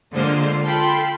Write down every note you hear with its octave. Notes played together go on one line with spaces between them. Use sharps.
D3 G#3 A#3 F4 C5
F4 A4 G5 A5 B5 C6